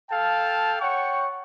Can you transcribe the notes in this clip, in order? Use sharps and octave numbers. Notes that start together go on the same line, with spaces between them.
A4 F5 G5 A5
C#5 F#5 G5 C#6